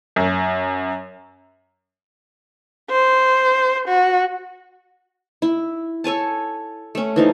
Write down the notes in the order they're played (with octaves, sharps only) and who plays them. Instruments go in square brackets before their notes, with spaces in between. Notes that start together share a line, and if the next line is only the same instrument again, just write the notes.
[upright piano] F#2
[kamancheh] C5
F#4
[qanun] E4
A4 C#5 G#5 A5
A3 C#4
E3 F3 D#4